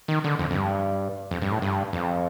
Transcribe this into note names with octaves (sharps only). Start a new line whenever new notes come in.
D#3
D3
F2
F2
G2
F2
G2
A2
G2
F2